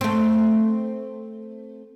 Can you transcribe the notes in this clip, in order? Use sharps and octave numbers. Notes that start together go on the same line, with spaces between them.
A3 C4